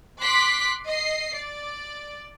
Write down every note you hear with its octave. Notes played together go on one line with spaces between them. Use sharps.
C6 D6 F#6 B6
D#5 C7
D5